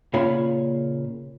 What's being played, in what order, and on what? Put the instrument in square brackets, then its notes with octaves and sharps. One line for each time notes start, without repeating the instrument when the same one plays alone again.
[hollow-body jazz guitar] A#2 C#3 F4 C#5 F5 B5